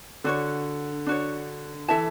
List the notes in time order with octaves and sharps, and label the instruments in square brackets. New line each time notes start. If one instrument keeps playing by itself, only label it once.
[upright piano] D3 [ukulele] D4 F#4 C#5
[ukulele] D4 F#4 C#5
[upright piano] E3 [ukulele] A4 E5 A5